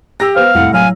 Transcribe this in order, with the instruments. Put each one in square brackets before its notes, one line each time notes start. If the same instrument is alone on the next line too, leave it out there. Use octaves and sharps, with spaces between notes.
[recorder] G4 [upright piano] E6 A#6
[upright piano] B3 C5 [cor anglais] F5
[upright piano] C2 A2 [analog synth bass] F2 [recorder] F#5
[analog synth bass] F#3 [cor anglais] F5 [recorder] G#5